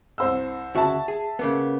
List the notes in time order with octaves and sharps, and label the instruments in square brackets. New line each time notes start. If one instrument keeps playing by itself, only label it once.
[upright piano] C2 C5 E6
[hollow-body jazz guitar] D2 C#3 F#4 [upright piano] E5 A5
[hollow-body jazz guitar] G#4
C#3 A#3 B3